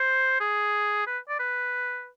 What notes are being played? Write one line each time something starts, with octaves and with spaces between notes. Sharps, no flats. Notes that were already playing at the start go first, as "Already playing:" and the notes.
Already playing: C5
G#4
B4
D5
B4